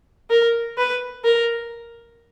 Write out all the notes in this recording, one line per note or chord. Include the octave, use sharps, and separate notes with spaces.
A#4
B4
A#4